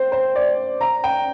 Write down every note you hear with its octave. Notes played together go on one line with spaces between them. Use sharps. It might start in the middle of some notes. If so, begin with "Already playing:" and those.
Already playing: C5 G5
C5
D5
A#5
G5